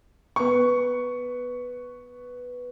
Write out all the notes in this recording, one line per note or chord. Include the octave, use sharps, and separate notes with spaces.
B3 C#6